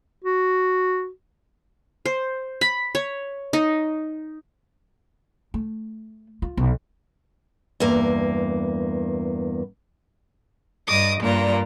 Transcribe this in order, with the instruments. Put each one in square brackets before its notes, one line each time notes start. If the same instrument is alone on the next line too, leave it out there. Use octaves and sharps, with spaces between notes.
[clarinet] F#4
[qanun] C5
B5
C#5
D#4
[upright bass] A3
F4
B1
[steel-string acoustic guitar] E2 G2 A#3
[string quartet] G2 D#5 D6 D#6
G2 A#2 A#3 D5 A#5